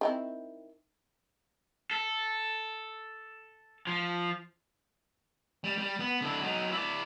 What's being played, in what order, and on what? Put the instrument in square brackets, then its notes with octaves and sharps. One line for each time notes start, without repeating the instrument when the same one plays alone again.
[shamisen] D#3 C4 E4
[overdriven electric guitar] A4
F3
[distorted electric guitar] G3
G3
B3
D3 E4
F#3 D#4
E4 D5